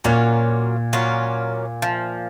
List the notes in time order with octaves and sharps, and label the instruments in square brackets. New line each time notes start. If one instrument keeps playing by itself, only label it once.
[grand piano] A#2 [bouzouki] F#3 A#3 C#4 F4
[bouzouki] F#3 A#3 C#4 F4
F3